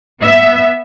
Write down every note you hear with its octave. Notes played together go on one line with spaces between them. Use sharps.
B3 E5